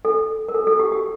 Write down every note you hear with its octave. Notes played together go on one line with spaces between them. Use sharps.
A4
A#4
A4
A4
G4
G4